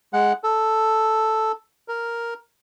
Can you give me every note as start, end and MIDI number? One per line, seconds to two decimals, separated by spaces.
0.13 0.33 56
0.13 0.33 78
0.44 1.52 69
1.88 2.34 70